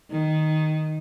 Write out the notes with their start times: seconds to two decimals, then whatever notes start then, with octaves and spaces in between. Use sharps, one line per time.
0.11 D#3